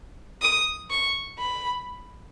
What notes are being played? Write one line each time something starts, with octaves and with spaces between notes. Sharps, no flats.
D#6
C#6
B5